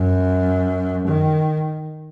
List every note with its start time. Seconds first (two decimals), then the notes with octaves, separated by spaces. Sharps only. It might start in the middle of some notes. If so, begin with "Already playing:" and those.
Already playing: F#2
1.07 D#3